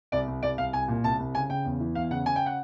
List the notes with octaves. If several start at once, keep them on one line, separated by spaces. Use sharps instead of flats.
C2 D5
C2
C2 D5
C2 F5
C2 G#5
A#2
C2 A5
C2
C#3 G#5
C#3 G5
E2
E3
E2 F5
C#3 F#5
C#3 G#5
G5
F#5